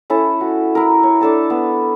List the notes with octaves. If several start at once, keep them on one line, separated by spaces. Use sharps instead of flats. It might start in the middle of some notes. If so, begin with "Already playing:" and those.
C#4 E4 A4
F#4
E4 A#4
C#5
D4 A4 A5
B3